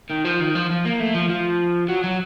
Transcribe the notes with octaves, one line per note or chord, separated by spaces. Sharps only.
D#3
F3
D#3
F3
F3
A#3
A3
F3
F3
F#3
F#3